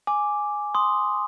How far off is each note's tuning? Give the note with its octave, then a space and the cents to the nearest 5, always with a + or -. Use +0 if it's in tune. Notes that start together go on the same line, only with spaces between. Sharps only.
G#5 +0 D6 +0
C6 +0 D#6 +0